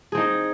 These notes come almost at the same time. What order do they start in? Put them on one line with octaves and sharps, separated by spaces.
G#4 C4 D#4